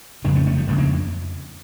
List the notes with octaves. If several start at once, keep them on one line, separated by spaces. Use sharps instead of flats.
F2 C#3 A#3 D4
A3 C#4
A3 C#4
F3 A3
F2 C#3 G3 A#3
A#3 D4